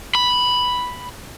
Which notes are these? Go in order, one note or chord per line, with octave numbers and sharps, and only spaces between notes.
B5